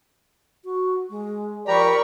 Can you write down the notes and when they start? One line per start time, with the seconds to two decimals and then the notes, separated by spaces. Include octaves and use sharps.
0.65 F#4
1.10 G#3
1.67 F3 G4 A#4 D5 A#5 B5 C#6